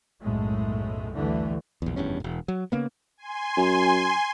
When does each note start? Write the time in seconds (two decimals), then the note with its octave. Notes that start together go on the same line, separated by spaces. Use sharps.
0.22 B1 F#2 A2 G#3 A3
1.15 A1 D2 G2 D3 E3 A3
1.82 A#1 E2
1.96 F1 E2 G2 C#4
2.20 E1 A2
2.48 F#3
2.72 C#3 A#3 B3
3.17 G#5 C6
3.57 F#2